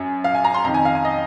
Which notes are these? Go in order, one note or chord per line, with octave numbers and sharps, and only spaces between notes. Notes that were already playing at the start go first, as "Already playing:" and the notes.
Already playing: F#2 G#5
F5
G#5
A#5
C6
F2 D#3 A#5
G#5
F5
G#5
D#5